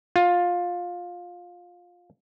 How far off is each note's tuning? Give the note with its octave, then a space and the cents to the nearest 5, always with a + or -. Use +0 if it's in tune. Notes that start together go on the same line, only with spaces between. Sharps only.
F4 +15